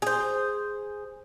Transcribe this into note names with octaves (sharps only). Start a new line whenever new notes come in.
G#4 C5